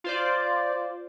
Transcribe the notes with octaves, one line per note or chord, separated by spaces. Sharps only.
F4 C5 D5